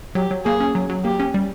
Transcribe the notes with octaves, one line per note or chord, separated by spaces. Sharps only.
F#3 G4
F#3
A#3 G#4
C#4
F#3
F#3
A#3 G4
C#4
G3